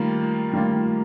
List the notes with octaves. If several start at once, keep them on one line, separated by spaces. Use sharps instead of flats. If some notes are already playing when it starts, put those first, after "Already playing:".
Already playing: D#3 G3 A3 A#3 F4
D#3 G3 A3 A#3 F4